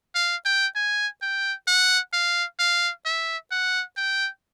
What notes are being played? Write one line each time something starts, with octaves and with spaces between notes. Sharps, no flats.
F5
G5
G#5
G5
F#5
F5
F5
E5
F#5
G5